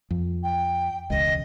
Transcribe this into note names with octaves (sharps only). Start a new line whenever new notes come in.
F2
G5
E1 C#2 D#5